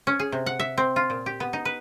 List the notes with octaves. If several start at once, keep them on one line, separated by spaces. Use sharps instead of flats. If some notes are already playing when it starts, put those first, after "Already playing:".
C#4
G#4
C3
F#5
E5
C4
F4
A#2
G4
B3
D#4
B4